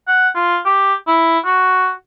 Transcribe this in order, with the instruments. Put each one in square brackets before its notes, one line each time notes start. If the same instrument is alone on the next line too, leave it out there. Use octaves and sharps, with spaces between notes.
[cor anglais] F#5
F4
G4
E4
F#4